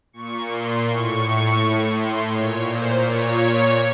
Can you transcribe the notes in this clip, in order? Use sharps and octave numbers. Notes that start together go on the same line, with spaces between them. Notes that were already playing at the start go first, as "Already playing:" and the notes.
A#2 C#6
C6
A2 C#6
A2
C6
A#2 C#5
C5
A#2 C#5